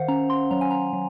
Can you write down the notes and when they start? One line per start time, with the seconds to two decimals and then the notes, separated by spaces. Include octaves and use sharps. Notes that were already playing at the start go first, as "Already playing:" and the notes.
Already playing: D#3 C5 F5 F#5
0.08 C#4 A#5
0.30 C6
0.51 F#3 A#5
0.61 G#5
0.71 A#5
0.93 F#3